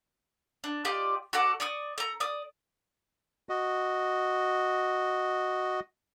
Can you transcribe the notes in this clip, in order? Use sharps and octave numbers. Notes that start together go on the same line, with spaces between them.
D4
F4 G4 D5 D#5
F#4 A4 D5 F#5
D5 C#6 D#6
A4 A#5
D5 D#6
F#4 D#5